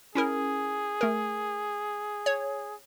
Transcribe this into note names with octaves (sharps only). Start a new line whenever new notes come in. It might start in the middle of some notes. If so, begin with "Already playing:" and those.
C#4 E4 G#4 A#4
A3 A#4
C#5